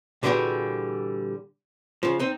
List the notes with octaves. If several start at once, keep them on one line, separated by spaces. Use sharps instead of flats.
A#2 D3 E3 G3 F#4 G#4
C#3 F3
C4 D#4